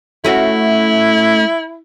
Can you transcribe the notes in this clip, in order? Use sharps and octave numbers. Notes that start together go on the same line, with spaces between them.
A3 C#4 E4 F#4